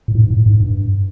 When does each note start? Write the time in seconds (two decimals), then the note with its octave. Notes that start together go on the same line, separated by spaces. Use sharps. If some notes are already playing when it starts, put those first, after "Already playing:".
0.08 A2
0.15 G#2
0.31 A2
0.46 G#2
0.60 G2